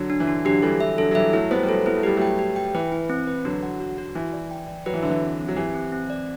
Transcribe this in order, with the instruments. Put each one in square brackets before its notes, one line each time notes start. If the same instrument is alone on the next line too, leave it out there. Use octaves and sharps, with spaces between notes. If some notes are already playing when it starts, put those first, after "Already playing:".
Already playing: [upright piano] D3 F#3
[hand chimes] D4
[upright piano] E3
[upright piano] D3 [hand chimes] D4
[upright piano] D3 F#3 [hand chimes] G4
[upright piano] E3 G3 [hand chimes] A4
[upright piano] E3 [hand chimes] E5
[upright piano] D3 F#3 [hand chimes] A4
[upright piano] F#3
[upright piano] E3 G3 [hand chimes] E5
[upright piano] F#3 A3 [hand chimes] E4
[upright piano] G3 B3 [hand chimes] C5
[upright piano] G3
[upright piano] F#3 A3 [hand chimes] A4
[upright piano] B3 [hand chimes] E4
[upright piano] A3
[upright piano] G3 [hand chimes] G4
[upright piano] F#3 A3 [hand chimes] G5
[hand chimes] G4
G5
[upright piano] E3 [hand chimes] B4
[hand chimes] E4
C4
B4
[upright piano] D3 F#3 [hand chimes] F#4
[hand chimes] F#5
F#4
F#4
[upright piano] E3 [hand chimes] E4
[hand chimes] D5
G5
D5
[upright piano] F#3 [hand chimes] B4
[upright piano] E3
[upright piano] D3 [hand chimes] E5
[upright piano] E3
[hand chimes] C4
C4
[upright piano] F#3
[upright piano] E3 [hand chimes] G4
[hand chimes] C4
C4
D5